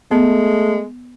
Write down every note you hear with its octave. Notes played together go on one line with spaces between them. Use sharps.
G#3 A3 B3